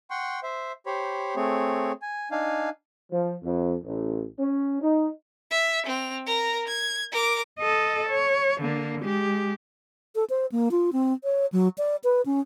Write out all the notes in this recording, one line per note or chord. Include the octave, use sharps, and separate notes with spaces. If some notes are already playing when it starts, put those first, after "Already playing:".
F#5 G5 C6 C#6
C5 E5
G4 C5 C#5 B5
A3 C4 G#4 C#5
G#5
D4 D#4 F5 G#5
F3
F2
A1
C#4
D#4
E5
C4 F7
A#4 A#5
G#6
A#4 D6
A4 D#5
C#5
D3 A#3
G#3 G4
A4
C5
A#3
F4
C4
C#5
F#3
D5
B4
C#4